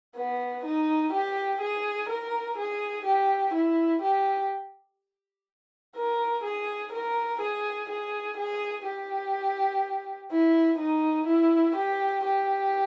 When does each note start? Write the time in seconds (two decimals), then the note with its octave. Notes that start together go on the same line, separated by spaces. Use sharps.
0.16 B3
0.64 D#4
1.13 G4
1.61 G#4
2.09 A#4
2.58 G#4
3.05 G4
3.54 E4
4.02 G4
5.96 A#4
6.43 G#4
6.92 A#4
7.41 G#4
7.89 G#4
8.37 G#4
8.85 G4
10.31 E4
10.78 D#4
11.27 E4
11.76 G4
12.25 G4